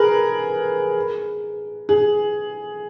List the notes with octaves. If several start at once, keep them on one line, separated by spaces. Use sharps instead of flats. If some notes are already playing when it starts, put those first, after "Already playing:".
Already playing: G#4 A#4 B4
G#4